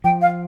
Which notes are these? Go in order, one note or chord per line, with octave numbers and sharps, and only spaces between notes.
F3 G5
F5